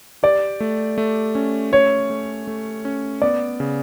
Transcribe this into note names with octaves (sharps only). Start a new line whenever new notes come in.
G4 D5
A3
A3
C#4
A3 C#5
A3
A3
C#4
B3 D5
C#3